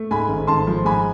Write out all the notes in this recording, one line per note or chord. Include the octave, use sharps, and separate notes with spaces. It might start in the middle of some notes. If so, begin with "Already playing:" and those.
Already playing: A3
G#2 G#5 B5
G#1
G#1 A5 C6
F3
G#2 G#5 B5